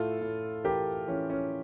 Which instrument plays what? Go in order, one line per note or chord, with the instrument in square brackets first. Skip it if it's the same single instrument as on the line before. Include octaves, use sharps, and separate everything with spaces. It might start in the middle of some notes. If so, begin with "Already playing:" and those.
Already playing: [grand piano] A2 F4 A4
A2
E3 G4 A#4
E3 C#4
C#4